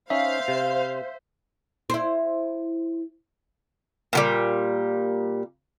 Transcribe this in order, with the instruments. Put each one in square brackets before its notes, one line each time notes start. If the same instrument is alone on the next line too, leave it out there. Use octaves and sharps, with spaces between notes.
[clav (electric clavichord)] C#4 D#4 [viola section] C5 [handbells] E5 [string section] F5
[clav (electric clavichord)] C3
[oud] E4 C5
[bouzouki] A#2 F#3 G3